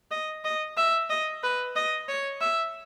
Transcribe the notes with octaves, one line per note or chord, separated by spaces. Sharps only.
D#5
D#5
E5
D#5
B4
D#5
C#5
E5